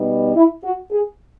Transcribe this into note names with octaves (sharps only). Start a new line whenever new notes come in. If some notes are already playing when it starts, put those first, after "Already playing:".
Already playing: B2 G3 B3 D#4
E4
F#4
G#4